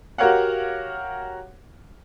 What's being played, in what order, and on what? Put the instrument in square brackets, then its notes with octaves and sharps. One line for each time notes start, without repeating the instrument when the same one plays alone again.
[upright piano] F#4 G4 A#4 C#5 F5 F#5